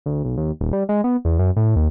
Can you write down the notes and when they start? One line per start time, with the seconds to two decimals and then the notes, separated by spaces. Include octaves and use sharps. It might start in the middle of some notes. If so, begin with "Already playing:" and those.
0.06 D2
0.25 B1
0.37 D#2
0.61 D#1
0.73 G3
0.89 G#3
1.04 B3
1.25 E2
1.39 F#2
1.56 A2
1.76 D#2